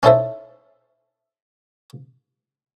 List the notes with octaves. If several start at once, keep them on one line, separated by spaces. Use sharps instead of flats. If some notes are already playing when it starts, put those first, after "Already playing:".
C#4 D#4 E4 A4 C5 E5